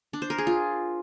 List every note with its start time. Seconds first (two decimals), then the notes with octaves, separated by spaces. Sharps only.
0.13 D4
0.22 C5
0.30 A#4
0.38 G#4
0.47 F4